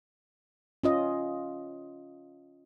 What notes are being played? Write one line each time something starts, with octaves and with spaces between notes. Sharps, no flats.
C#4 F4 D#5